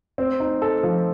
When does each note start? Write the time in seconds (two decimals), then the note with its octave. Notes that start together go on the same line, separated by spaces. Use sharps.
0.18 C4
0.40 D#4
0.62 A4
0.83 F3